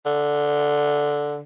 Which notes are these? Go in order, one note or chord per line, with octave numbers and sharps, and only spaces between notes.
D3